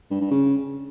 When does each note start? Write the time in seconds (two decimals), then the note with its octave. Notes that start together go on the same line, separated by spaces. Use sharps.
0.11 G2
0.21 G2
0.31 C#3